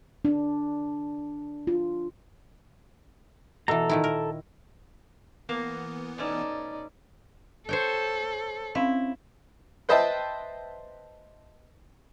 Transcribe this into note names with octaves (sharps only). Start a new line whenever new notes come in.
D4
F4
B2 E3 A4 A#5
A#2 D#3 E4
A#4
E3 A#3 B3
B2 A3 C#4 D#4 D5
A4 C5 C#5 G5
C4 C#4 E4 F5
B4 C5 D#5 E5 G5 A5